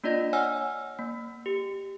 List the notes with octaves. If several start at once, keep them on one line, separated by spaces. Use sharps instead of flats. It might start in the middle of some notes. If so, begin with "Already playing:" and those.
A#3 D4 F4 D5 D#5 A#6
C#5 F#5 G#5 E6 F6
A#3
G4